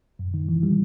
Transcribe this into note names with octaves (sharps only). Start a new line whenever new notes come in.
F#2
D#3
E3
G3